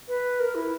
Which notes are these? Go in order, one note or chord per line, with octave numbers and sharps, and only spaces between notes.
B4
A#4
E4